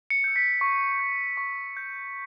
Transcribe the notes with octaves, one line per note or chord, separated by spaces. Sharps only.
C#7
E6 G6
B6
C#6
G6
C#6
G6